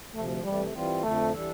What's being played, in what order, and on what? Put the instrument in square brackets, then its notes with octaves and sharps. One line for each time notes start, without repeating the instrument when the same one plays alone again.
[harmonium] D2 C3 F3 [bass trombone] A3
[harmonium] C3 E3 A3 [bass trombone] G3
[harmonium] E3 G3 C4 F4
[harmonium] F2 D3 F3 [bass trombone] A3
[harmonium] E3 G3 D4 A4